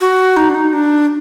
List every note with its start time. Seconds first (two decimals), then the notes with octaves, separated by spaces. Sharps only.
0.01 F#4
0.37 D#4
0.49 D4
0.54 D#4
0.73 D4